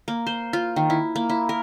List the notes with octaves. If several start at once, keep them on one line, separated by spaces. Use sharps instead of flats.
A#3
C5
F4
D#3
E4
A#3
E4
A#4